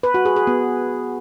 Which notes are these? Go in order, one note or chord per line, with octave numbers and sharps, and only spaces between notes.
B4
F#4
G#4
G#4
B3